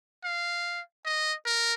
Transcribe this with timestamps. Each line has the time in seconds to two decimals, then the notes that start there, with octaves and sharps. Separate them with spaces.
0.24 F5
1.05 D#5
1.46 A#4